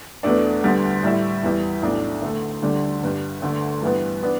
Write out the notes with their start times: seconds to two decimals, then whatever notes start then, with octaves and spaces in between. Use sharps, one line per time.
0.23 E2 B2 A3 D4
0.63 D2 D3 G3 B3
1.03 A2 G3 E4
1.43 E2 E3 G3 E4
1.82 B1 A2 A3 D4
2.22 D2 D3 A3
2.62 D2 D3 G3 D4
3.02 G1 G2 G3
3.42 D2 D3 A3 D4
3.82 G2 E3 G3 B3
4.23 E3 B3 D4